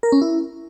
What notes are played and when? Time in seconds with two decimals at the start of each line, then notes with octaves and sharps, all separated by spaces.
0.03 A#4
0.12 C#4
0.22 E4